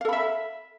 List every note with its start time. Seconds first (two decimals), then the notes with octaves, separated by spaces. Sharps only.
0.01 F5
0.05 A4
0.09 B5
0.13 E5